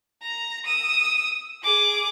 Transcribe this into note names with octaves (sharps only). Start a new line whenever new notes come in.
A#5
D#6 E6
G#4 D6